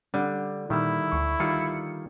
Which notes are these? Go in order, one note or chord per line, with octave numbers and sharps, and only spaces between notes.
D3 G3
A#2 D#3 G3 E4
D2 C#6
D#3 G3 F4 C#7